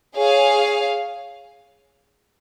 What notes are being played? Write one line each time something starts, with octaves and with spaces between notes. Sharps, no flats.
G#4 C#5 F5